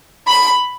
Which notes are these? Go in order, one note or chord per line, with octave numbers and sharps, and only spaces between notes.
B5